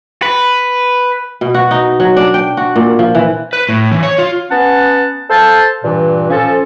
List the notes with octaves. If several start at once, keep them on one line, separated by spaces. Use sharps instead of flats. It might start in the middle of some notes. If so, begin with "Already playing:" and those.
B4
B2
F#4
D#4
F#3
D4
G5
F#4
A#2
F3
E3
B4
A2
E3
C#5
F4
B3 C#4 F#5 A5
A4 C5 F5 A5
G2 A#2 E3
F3 C#4 A4